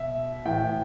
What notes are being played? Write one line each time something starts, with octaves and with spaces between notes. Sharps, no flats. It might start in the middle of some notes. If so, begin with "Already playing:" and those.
Already playing: B2 E5
A2 E3 G5